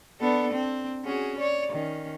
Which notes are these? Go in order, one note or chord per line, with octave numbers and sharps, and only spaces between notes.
B3 D4 A4
C4
C#4 F#4 G#4
C#5 D5
D#3 C#4